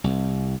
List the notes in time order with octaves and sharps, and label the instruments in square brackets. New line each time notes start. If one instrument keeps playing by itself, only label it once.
[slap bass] C2